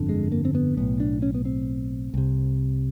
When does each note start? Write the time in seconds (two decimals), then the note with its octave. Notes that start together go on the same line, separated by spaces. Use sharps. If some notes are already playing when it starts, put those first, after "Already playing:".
Already playing: G1 F2 D3
0.09 G#3
0.32 A#3
0.45 C4
0.55 B3
0.77 B1 A2 B3
1.00 D4
1.22 C#4
1.34 B3
1.45 C4
2.14 C2 C3